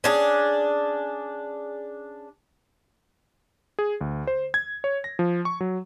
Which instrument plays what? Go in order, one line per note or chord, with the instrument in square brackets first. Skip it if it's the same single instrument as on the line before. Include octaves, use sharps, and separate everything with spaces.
[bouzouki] C#4 D4 G#4
[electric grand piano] G#4
D2
C5
G#6
C#5
A#6
F3
C#6
F#3